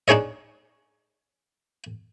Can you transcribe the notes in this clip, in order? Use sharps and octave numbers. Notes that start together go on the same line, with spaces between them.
D4 D#4 G#4 C#5 D#5